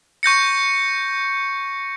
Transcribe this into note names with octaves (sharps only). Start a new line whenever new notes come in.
C#6 G6 A#6 C#7